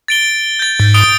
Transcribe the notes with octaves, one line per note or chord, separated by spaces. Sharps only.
A6 D7 G7
G6 A6
G#2
D#6 D7 G7